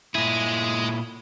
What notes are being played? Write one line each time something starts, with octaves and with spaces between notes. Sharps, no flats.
A#2 G#3 E4 G#4